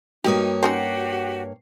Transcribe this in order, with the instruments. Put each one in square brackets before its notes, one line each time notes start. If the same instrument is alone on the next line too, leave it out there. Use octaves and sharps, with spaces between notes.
[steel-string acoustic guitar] G2 A#3 C#5 [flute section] D#4 [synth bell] F#4 G5 D#6 [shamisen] G4
[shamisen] C4 C#4 D#4 [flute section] F#4 G4 [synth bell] C7